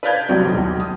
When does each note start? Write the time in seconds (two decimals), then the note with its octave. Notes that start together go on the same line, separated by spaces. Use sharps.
0.03 B4 D5 F5 A5 G6 G#6
0.28 B1 C3 F#3 C4 D5
0.45 D#1 D#4
0.58 B1
0.80 D#6